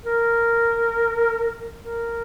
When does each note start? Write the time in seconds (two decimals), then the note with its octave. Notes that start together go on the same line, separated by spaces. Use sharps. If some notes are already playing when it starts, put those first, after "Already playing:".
0.05 A#4
1.82 A#4